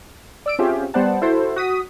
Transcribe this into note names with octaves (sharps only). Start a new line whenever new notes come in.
D5 E6 D7
C4 C#4 F4 G4 G#4 E5
G3 B3 C5 D5 F#5 A5
E4 F#4 A4 C5
F#4 D#6 B6